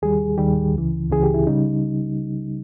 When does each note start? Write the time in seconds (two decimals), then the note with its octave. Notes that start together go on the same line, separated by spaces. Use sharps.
0.02 D#2 D#3 G3 G#4
0.38 D#2 D#3 G3 G4
0.74 C#2 C#3 E3
1.10 C#2 C#3 E3 G#4
1.23 G4
1.34 E4
1.47 C#3 G3 D#4